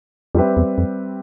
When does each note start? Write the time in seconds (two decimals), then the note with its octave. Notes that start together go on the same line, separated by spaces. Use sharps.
0.35 F2 G3 C4 G4 B4 E5
0.57 E2
0.78 F2